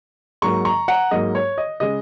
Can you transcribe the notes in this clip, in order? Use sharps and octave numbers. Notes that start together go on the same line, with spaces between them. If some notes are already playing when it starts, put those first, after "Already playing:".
G#2 F#3 A#3 A#5 C#6
A#5 C#6
F#5 A#5
G#2 F#3 A#3 D#5
C#5
D#5
C#3 G#3 D#5